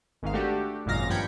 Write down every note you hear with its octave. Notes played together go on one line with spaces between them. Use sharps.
G#1 G#2 D#3 F5
A3 D4 F#4 G4
G#1 F#2 A#2 D#3 F5 A#6
G2 F3 G5 B5 G#6 C#7